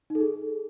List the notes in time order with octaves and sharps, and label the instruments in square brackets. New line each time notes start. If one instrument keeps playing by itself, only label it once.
[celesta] D#4
A4
G#4